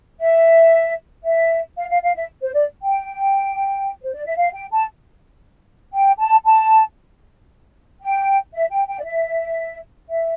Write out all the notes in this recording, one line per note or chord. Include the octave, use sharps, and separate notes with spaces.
E5
E5
F5
F5
F5
E5
C5
D5
G5
C5
D5
E5
F5
G5
A5
G5
A5
A5
G5
E5
G5
G5
D5
E5
E5